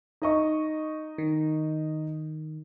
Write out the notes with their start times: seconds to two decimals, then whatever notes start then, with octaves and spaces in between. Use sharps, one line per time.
0.22 D#4 D#5 C#6
1.18 D#3